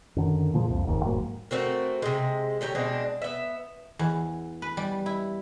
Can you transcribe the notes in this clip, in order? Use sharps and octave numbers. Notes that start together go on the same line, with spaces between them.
F#2 D3 D#3
A#2 F3 G#3
C2 F2
F1 D#2 G#2
D#1 G#2 F#3 A#3
A3 C4 F#4 A#4
C3 G#3
D3 C#4 G4 A#5
B2 G#3 C4 D4
B3 E5
E2
B4
G3
E4